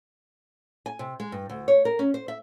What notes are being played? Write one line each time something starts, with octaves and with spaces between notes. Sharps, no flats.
G#5
C3
G#3
G2
D2
C#5
A#4
C#4
C5
E5